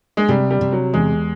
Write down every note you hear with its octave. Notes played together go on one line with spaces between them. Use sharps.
G#3
C3 G3
G3
C3
F#3
E2 G#3